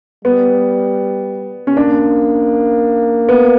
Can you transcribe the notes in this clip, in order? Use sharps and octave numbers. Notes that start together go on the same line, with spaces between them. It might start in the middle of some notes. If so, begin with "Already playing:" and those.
G3 B3
C#4
A#3 D4
B3